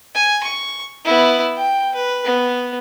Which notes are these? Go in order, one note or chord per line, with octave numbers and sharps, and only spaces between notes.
G#5
C#6
B3 E4
G5
B4
B3